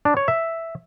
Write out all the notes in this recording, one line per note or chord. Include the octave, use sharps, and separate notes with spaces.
D4
C#5
E5